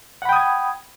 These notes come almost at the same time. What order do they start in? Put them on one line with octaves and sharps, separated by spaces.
F#5 B5 G5 D#6 G#6